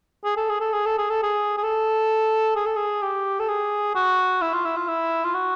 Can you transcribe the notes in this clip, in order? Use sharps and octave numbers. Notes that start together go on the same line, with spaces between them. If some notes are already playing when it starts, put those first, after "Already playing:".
G#4
A4
G#4
A4
G#4
A4
G#4
A4
G#4
G#4
A4
G#4
A4
G#4
G4
A4
G#4
F#4
E4
F4
E4
F4
E4
F4
F#4